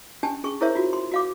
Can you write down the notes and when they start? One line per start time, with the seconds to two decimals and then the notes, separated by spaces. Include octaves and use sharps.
0.23 C#4 D4 G4 G#5 A5
0.44 C#4 G#4 C#6
0.61 E4 G#4 A#4 C5 C#5 E5
0.75 F4 F#4
0.93 C6
1.12 F#4 F5 D6